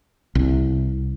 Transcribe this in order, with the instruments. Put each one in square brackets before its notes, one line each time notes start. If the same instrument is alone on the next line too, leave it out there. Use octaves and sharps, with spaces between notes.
[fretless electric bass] C2